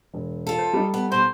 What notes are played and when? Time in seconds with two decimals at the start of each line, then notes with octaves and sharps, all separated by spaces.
0.14 E1
0.47 F4 A4
0.59 C5
0.73 G3 D#4
0.94 B3
1.12 B2 C5